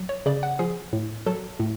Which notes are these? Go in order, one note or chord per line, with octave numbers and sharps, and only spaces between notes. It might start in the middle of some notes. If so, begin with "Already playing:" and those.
Already playing: F#3
C#5
C#3 D5
F#5
F3 G#4
A2
F#3 A4
A2